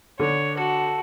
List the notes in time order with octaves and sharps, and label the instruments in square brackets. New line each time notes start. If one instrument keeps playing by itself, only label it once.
[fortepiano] D3 [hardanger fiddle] C#5
[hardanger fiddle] F#4 [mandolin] A4